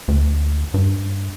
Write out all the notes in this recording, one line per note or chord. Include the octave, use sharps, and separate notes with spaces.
D2
G2